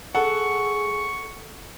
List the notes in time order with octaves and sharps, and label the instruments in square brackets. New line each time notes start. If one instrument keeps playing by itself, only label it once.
[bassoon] G#4 [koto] A4 [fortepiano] F#5 [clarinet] C#6